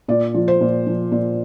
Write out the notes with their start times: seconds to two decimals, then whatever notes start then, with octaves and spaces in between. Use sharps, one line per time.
0.08 A#2 D5
0.34 F3
0.48 C5
0.61 A#2
0.87 F3
1.12 A#2